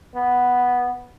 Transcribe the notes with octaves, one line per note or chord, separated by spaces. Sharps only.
B3